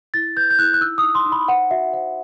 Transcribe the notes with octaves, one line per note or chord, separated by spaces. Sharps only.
E4 A6
B4 G6
G6
E4 F#6
F#6
D#4 E6
D#6
D#4
C6
D#4
B5
C5 F#5
F#4 E5
C5 F#5